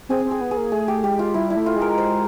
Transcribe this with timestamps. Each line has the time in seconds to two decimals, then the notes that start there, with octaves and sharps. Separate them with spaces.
0.09 C4 G#4
0.25 C4
0.31 G#4
0.41 B3
0.51 G#4
0.57 A#3
0.72 A3 G#4
0.88 G4
1.04 G#3 G4
1.19 F4
1.34 G3 E4
1.50 E4
1.56 A3
1.66 F4
1.76 G#3
1.82 A#4
1.98 C5